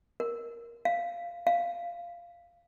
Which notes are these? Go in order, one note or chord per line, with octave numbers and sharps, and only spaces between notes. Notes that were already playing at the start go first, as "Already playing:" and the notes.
A#4
F5
F5